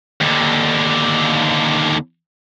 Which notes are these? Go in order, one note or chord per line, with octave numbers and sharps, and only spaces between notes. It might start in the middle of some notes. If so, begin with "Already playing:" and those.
D#2 D3